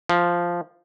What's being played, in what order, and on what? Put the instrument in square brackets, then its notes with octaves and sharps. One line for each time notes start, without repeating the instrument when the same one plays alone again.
[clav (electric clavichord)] F3